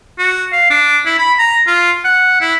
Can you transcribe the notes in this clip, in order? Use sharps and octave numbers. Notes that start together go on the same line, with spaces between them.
F#4
F5
D4
E4
B5
A#5
F4
F#5
E4